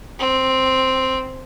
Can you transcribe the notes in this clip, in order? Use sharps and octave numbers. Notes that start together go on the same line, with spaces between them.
C4